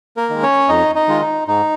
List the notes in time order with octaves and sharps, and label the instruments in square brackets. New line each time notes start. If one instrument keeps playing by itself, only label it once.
[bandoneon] A#3 A#4
D#3 G#3
C#4 C#5
F2 D#4 D#5
D#4 D#5
D#3 G#3 F4
D#4
G#2 D#4